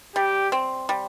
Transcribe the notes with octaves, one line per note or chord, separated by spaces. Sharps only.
G3 G4
C4
G3